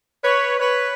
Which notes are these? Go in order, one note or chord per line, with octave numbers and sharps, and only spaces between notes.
B4 C#5
B4 C#5